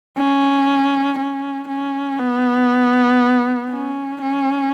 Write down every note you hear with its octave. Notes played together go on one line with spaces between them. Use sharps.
C#4
C#4
C#4
B3
C#4
C#4